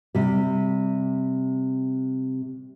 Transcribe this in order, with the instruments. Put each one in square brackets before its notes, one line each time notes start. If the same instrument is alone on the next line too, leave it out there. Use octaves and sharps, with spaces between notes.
[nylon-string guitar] C3 G3